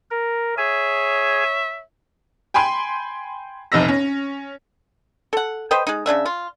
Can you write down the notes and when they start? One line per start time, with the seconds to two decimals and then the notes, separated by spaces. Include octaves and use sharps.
0.11 A#4
0.58 G#4 C#5 E5 G#5
2.54 G5 G#5 B5 C6
3.72 F1 C2 C3 D#4 E6 A#6
3.88 C#4
5.33 A4 F#5
5.71 B4 C5 D#5 G5
5.87 G#3 D#4
6.06 C#3 G#3 D4 E5
6.26 F4